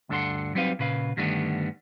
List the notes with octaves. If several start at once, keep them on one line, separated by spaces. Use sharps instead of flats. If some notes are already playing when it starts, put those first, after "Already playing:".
D2 G2 D4 A4 F#5 C6
F#3 G3 C4 D#4 B4 F5
A#2 C#3 B4 F5
G2 D3 D#3 G3 A3 B3